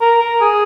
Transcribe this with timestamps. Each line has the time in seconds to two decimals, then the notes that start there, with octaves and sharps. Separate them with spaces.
0.01 A#4
0.20 A#4
0.40 G#4